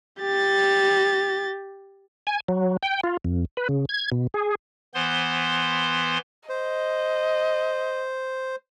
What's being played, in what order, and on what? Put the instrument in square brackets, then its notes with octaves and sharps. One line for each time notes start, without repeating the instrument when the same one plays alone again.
[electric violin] G4 A6
[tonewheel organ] G#5
F#3
G5
F4
F2
B4
C#3
G#6
B2
G#4
[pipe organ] E3 B3 C5 C6
[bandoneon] C5 [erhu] D#5